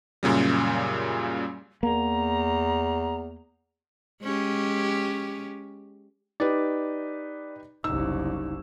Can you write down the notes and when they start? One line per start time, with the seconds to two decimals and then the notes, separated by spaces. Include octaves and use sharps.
0.23 F#2 A#2 C#3 G3
1.83 E2 A#3 A#5
4.23 G#3 C#4 G4
6.40 D#4 G4 B4 D5
7.84 F#1 C2 D#4 E6